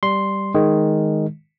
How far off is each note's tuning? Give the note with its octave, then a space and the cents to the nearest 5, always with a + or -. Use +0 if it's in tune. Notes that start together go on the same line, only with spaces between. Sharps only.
G3 +0 C6 +0
D#3 +0 G#3 +0